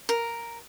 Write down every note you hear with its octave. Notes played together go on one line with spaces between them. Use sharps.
A#4